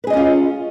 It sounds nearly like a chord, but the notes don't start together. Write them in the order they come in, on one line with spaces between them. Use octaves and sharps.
B4 G#4 D#5 C#4 F4